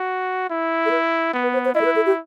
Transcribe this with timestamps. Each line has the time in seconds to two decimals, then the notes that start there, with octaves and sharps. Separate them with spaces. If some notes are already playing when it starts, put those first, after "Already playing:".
Already playing: F#4
0.50 E4
0.86 A4
0.91 B4
1.33 B3
1.43 B4
1.53 C5
1.65 C5
1.75 E4 D#5
1.81 A4
1.85 B4
1.96 A4
2.06 G4